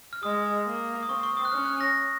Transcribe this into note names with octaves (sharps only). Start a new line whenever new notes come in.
F6
G#3 D#6
A#3
D#6
C4 C#6
C#6
D#6
F#6
C#4 F6
F#6
A#6